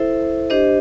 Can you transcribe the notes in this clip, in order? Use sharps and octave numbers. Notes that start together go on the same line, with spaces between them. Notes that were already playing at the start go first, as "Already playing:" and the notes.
Already playing: E4 A4 C5 E5
D4 G4 C5 D#5